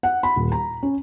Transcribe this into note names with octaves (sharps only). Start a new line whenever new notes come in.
F#5
B5
D#1
A#5
C#4